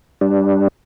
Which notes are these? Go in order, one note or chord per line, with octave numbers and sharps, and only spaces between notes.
G3 D4